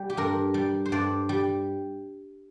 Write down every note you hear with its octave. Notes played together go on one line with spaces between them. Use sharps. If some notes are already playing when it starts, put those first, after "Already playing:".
Already playing: G3
G4
G2 A#4
G3
C5
G2 D5
G3